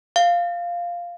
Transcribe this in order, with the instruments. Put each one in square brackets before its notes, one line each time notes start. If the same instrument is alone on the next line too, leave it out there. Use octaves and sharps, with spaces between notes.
[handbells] F5